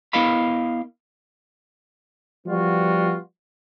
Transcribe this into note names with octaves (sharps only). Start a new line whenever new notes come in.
B3 E4 A#4 D#5 F5 B5
F3 G3 B3 F4 F#4